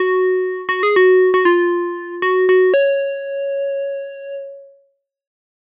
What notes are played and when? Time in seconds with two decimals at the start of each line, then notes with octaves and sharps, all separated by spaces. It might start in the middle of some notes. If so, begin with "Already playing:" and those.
Already playing: F#4
0.69 F#4
0.83 G#4
0.96 F#4
1.34 F#4
1.45 F4
2.22 F#4
2.49 F#4
2.74 C#5